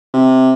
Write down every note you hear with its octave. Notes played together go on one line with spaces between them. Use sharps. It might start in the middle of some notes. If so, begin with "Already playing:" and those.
C3